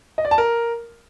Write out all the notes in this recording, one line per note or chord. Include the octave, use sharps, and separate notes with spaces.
D#5
D5
A5
A#4